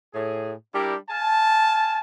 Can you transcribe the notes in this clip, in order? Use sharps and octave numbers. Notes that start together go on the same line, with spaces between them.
A2 G#4
G3 D4 E4 G4 A#4
F5 G#5 A5